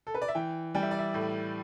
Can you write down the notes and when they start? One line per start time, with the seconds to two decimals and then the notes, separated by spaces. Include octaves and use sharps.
0.07 A4
0.14 B4
0.22 D5
0.28 E5
0.35 E3 G5
0.75 G3 G5
0.82 E5
0.91 D5
0.99 E5
1.14 A2